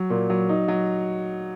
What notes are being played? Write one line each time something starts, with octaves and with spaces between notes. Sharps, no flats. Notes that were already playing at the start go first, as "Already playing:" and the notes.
Already playing: F#3
A#2
F#3
D#4
F#3